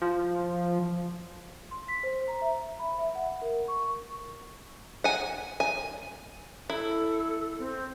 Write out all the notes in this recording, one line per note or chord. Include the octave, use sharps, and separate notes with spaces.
F3
C6
B6
C5
A#5
E5
B5
E5
F#5
A#4
C#6
F#5 G#5
G#5
E4 A4
C4